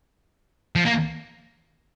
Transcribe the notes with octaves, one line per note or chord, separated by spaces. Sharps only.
F3
A#3